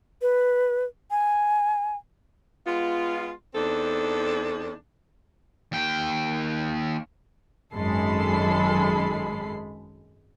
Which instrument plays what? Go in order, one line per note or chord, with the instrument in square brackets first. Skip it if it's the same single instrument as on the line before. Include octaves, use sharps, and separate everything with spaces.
[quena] B4
G#5
[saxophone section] G#3 B3 F4
E2 C4 D4 D#4 A4
[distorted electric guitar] D#2 G5
[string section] G#1 F#2 G#3 A4 B5 C7